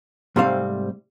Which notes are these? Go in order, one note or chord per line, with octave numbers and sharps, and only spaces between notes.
G#2 C3 G3 A3 C4 F5